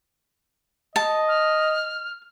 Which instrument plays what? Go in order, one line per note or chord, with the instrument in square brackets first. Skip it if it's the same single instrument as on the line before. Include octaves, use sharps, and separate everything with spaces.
[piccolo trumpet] D#5 [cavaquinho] A5
[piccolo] F6